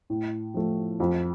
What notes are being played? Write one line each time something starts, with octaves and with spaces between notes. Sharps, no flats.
A2
F3 A3
F2